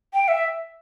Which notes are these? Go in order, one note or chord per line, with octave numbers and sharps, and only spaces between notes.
G5
E5